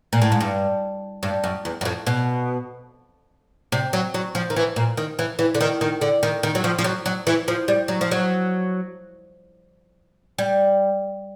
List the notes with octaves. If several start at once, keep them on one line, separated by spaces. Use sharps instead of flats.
A#2
A2
G#2
G2
G2
F#2
E2
F#2
F2
B2
C3
F#3
F#3
F3
D#3
E3
A#2
D#3
E3
E3
D3
D#3
D#3
D3
D#3
D#3
F#3
F3
F3
F#3
F#3
E3
F3
G3
F#3
F3
F#3
G3